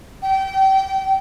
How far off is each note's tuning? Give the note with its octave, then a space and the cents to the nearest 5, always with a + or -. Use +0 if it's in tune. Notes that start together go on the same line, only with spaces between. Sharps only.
G5 -30